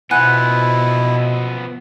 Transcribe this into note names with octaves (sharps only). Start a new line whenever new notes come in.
B2 F3 B3 E4 F#5 G#5 F#6